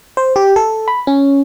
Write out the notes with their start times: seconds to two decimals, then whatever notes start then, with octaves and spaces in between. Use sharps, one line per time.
0.17 C5
0.36 G4
0.56 A4
0.88 B5
1.07 C#4